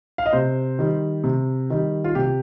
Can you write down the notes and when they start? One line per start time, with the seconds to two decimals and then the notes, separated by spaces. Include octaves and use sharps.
0.18 F5
0.26 D#5
0.33 C3 C5
0.79 D#3 G3
1.24 C3
1.70 D#3 G3
2.04 F4
2.15 C3 G4